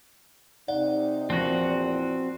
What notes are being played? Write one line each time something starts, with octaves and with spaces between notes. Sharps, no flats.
C3 D#4 D5 F#5
E2 A#2 F3 C4 F#4 F#6 A#6